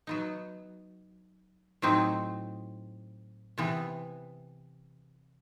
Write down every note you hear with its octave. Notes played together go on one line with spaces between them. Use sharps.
F#3 B3 D#4
A2 F#3 C4 D#4
C3 E3 B3